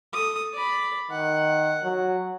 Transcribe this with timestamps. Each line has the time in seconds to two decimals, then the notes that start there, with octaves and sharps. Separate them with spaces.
0.13 A4 D#6
0.54 D5 B5
1.11 D#3 F#5
1.84 F#3